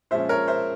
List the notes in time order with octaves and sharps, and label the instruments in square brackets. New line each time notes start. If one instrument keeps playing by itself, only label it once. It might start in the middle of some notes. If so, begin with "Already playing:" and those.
[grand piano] A#2 F3 G#3 C#4 C5 E5
A#4 C#5
C5 E5